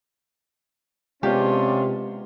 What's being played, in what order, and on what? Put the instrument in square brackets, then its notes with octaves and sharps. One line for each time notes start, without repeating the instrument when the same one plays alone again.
[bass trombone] C3 [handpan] G#3 B3 [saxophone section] C#4 D4 F4 [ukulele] G4